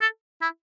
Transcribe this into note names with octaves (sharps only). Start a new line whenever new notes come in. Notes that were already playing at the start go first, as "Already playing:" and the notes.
A4
E4